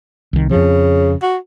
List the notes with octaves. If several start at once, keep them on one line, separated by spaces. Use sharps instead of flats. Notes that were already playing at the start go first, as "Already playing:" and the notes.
C2 D#3
F2 C#3 F3
F#4